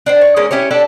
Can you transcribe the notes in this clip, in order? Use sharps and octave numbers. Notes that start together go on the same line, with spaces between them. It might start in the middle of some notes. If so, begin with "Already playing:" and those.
D4 C5 G5
C#5
G#3 A#3 C#4 A#4
C#4 E4 G4 C#5
D4 G4 A4 D5